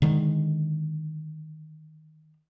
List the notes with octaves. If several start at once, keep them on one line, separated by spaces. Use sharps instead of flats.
D3 D#3 G#3